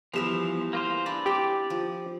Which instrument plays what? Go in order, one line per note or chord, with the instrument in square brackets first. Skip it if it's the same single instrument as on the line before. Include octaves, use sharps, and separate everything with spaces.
[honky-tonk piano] E2 G3 E7 [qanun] E3 E5 C6 [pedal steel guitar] F3
[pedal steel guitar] A#3 F4 C5
[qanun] D4 E4 [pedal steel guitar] D5
[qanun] C4 G5 [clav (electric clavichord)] G4
[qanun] F3